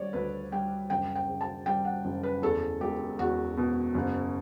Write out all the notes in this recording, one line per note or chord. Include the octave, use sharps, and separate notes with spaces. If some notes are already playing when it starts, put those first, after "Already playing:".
Already playing: G3 C#5 D5
D2 B4
G3 G5
F#1 G5
G5
C#3
A5
G3 G5
F#5
F#1
B4
E2 A4
E1 G4
E2 F#4
B2
F#1